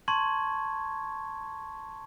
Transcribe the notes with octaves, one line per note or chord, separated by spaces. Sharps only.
A5 C6 C#6 G#6